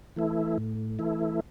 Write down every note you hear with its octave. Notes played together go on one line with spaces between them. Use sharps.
E3 A3 E4
A2
E3 A3 E4